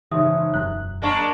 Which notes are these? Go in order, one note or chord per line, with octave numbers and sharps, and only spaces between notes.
F#1 G#2 E3 D#4 C#5 E5 D#6
E1 F#2 F#3 F#6
G#3 A#3 D4 D#5 A5 C#6